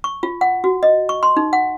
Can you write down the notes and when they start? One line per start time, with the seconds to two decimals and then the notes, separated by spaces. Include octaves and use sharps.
0.04 C#6
0.23 F4
0.41 F#5
0.64 F#4
0.83 D#5
1.09 C#6
1.23 C6
1.37 D#4
1.53 F#5